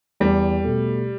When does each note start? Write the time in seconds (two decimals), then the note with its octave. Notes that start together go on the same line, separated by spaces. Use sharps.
0.20 E2 G3
0.64 B2 A3